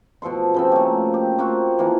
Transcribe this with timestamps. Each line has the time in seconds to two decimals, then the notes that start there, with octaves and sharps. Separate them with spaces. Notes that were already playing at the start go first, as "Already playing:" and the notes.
0.22 B2 F3 A4 C6
0.54 C#3 F3 C4
0.72 A3 A#3
1.14 G4
1.38 A#3 C4 F4 F#4
1.79 E3 F3 A#3